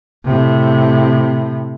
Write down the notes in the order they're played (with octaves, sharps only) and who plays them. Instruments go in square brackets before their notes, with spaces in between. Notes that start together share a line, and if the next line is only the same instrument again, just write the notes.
[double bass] A2 C3